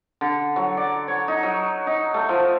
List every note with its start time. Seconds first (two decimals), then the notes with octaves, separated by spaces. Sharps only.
0.21 D3
0.56 F#3
0.77 D5
1.08 C#5
1.28 D#4
1.43 F#3
1.87 D#4
2.14 A3
2.29 F3